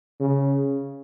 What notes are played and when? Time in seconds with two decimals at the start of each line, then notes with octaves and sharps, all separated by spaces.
0.20 C#3